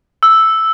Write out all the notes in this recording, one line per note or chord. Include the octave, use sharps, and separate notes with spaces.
E6